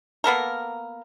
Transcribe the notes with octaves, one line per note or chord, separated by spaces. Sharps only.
A#3 B3 A4 A#4